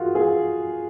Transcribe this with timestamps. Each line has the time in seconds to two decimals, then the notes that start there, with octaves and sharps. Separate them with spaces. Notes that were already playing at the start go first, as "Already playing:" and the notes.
Already playing: F4 F#4 G#4 A#4
0.15 G#4